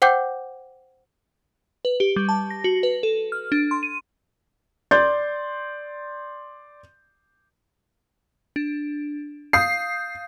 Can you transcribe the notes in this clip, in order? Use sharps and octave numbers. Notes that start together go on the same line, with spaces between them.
C5 F#5 G5 D6 G6
B4
G4
G3
A5
A#6
F#4
B4
A4
F6
D4
C6
D#7
D5 C6 G6 A6
D4
F5 D#6 G6 C7